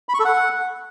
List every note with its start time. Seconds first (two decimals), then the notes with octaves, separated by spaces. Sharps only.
0.09 B5
0.14 C#6
0.20 A4
0.25 F#5